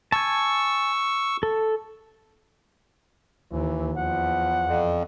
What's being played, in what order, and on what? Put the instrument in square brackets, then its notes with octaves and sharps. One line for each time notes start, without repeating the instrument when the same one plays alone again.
[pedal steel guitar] G#5 A5 [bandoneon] C#6 E6
[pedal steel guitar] A4
[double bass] D#2 [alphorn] E3
[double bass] E2 [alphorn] F3 [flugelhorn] F#5
[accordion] F2